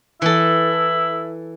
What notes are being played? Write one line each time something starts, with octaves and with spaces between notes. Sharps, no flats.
E3 E4 A4